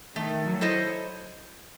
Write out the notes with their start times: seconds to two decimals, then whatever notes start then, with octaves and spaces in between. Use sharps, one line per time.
0.16 D#3 A3
0.46 F#3
0.61 E4 A4 C5 D#5